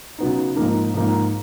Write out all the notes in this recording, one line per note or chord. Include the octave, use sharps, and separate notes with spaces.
C#3 F#3 B3 D#4
G#2 F3 A#3 D#4
G#2 F3 A#3 D#4